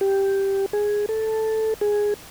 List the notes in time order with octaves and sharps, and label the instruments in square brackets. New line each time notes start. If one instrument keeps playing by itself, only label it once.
[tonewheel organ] G4
G#4
A4
G#4